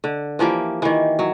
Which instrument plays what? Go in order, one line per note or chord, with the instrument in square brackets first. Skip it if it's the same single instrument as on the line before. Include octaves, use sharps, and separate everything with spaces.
[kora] D3
E3 F3 A#3 G4
D#3 E3
F#3